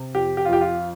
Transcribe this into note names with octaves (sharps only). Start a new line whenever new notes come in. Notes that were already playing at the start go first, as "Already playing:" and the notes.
Already playing: C3
F2 G4
G4
F4
F2 G4
F4